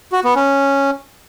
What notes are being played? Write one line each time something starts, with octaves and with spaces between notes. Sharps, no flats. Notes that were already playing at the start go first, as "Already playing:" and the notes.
F#4
B3
C#4